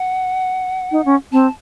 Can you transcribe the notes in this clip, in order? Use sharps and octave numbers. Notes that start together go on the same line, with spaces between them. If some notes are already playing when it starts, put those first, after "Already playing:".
Already playing: F#5
D#4
C#4
C4 A5